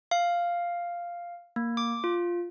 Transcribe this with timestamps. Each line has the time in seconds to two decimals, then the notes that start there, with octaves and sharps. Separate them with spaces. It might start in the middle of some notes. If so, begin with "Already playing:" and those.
0.11 F5
1.56 A#3
1.77 D6
2.04 F4